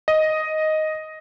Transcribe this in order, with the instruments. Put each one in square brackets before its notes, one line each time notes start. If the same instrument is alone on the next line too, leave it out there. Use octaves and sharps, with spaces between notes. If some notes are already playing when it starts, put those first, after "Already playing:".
[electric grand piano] D#5